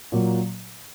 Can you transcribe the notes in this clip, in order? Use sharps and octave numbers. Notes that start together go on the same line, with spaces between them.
A#2 F#3 A#3